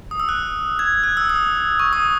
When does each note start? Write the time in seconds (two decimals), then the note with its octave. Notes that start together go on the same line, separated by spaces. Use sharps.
0.11 D#6
0.20 E6
0.29 F#6
0.79 G#6
1.03 F#6
1.17 E6
1.29 D#6
1.80 C#6
1.93 D#6